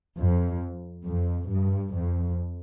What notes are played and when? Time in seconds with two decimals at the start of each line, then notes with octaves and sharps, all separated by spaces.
0.18 F2
1.05 F2
1.49 G2
1.93 F2